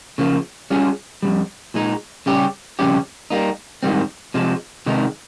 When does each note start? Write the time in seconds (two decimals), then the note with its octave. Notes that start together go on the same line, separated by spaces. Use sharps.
0.18 C#3 F3 A#3
0.70 G3 C#4 F4 G#4
1.23 F2 C3 G3
1.74 A#2 G#3 D#4
2.26 C#3 G3 C#4 G4
2.79 F2 C#3 G3 C#4 G4
3.30 G3 A#3 D#4
3.83 G#2 D#3 G3 C4
4.34 C3 F3 G#3
4.86 C3 D#3 G#3 D#4